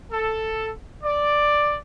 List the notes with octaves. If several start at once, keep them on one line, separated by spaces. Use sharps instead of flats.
A4
D5